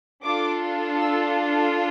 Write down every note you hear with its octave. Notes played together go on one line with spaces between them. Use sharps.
D4 F4 A4 D6
E6